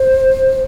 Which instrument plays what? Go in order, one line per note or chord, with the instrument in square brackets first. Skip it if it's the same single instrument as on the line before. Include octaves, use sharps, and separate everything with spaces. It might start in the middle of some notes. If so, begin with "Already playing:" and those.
Already playing: [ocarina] C5